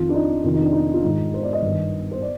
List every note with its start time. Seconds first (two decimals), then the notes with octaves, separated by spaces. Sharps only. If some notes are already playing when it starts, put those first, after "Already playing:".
Already playing: F2 D#3 F4
0.09 D4
0.14 D#4
0.44 F2 C3 D#3 F4
0.54 D#4
0.62 D4
0.73 D#4
0.93 F4
1.03 G#2 D#3 D#4
1.34 C5
1.43 D5
1.53 D#5
1.62 G2
1.68 D#3
2.12 C5
2.22 D5